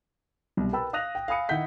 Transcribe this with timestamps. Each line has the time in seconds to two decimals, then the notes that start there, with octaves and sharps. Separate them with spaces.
0.57 C2 B2
0.73 A#4 B4 G5 A5 B5 E6
0.93 F5 D#6 F#6 A#6 F7
1.15 G5
1.28 F5 G#5 B5 D#6 C#7
1.49 D#3 E4 F#5 G6 B6